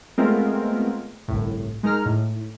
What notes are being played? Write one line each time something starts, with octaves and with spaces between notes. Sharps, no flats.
G#3 A3 B3 C4 F4 A#4
G1 C2 A2
G#3 D#4 A#4 A#5 F6
A2